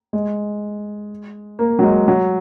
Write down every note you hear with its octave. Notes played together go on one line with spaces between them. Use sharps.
G#3
A#3
F#3
G#3
F#3